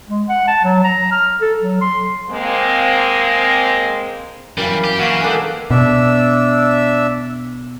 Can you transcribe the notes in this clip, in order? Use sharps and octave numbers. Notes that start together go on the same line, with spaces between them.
G#3
F#5
A5
F#3
A#5
F6
A4
F#3
C6
G#3 A#3 C4
F#2 E3 G3 A#4 F5
G4
E3 F#3 A#3 C#4 F5 F#5
G#3 D4 G4 A4 A#4 F5
B2 D4 E5 E6